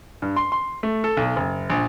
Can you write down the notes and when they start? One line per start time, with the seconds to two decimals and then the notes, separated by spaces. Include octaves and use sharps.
0.22 G2
0.36 C6
0.52 C6
0.83 A3
1.04 A4
1.17 B1
1.36 F#1
1.70 A#1